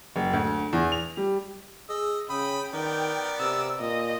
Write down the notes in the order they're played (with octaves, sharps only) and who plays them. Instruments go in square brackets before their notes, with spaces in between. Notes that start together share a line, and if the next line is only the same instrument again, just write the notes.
[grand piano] F#1
D2
E2
F7
G3
[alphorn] G#4 [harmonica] D#5 E6
[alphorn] C#3 [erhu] G5 [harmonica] B5 D#6
[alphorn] D#3 [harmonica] B3 A#4 D5 [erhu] G5
[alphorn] C3 [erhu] E6
[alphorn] A#2 [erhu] D#5